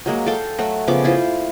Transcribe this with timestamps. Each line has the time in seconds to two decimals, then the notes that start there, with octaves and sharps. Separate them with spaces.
0.06 F#3 G#3 A#3
0.26 A4 F5 G5 A5
0.58 F#3 A3 F#4
0.87 C#3 F3 B3 D6
1.04 E4 F4 C5